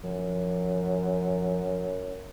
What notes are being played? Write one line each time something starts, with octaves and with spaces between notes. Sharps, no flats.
F#2 F3